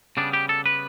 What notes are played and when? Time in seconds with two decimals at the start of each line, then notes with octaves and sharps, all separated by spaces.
0.17 C#3 G3 B3 D4
0.33 G4
0.49 A4
0.66 B4